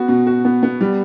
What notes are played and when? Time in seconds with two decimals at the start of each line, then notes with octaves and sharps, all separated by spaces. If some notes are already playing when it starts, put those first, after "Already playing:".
Already playing: B3 F#4
0.08 B2
0.27 F#4
0.45 B3
0.63 B3
0.81 G3